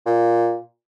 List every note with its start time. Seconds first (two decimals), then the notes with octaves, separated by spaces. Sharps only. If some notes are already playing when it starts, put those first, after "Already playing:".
0.06 A#2